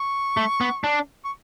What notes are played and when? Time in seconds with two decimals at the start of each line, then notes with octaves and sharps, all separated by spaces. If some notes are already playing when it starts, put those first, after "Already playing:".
Already playing: C#6
0.37 A3
0.61 B3
0.84 D4
1.25 C#6